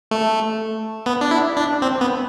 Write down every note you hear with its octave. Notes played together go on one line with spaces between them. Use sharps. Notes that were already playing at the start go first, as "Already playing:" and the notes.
A3
B3
D4
E4
D4
C4
B3